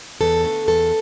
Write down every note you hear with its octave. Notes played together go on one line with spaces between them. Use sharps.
E2 A4
D3 A3
E2 A4